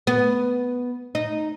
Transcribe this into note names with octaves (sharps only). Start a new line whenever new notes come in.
B3
D#4